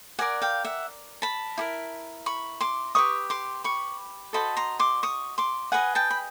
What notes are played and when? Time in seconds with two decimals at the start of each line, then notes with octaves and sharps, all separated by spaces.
0.19 G4 A#4 D5 F#5 G#5
0.42 F5 G5
0.65 E5 F#5
1.22 A5 B5
1.58 E4 G4 A#4
2.26 B5 C#6
2.60 C6 D6
2.95 G4 B4 D#5 C#6 D#6
3.30 C6 D6
3.64 B5 C#6
4.33 F#4 A4 C5 D#5 A5 B5
4.57 A#5 C6
4.79 C6 D6
5.03 C#6 D#6
5.38 C6 D6
5.72 G#4 B4 D#5 F#5 G#5
5.95 G5 A5
6.11 B5